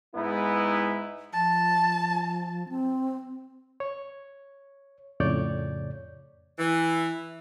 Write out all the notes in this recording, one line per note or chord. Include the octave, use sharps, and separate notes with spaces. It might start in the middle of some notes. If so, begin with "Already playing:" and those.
G#2 G#3 B3 D#4 E4
F3 A5
C4
C#5
F2 A2 C#3 C#5 D5 G6
E3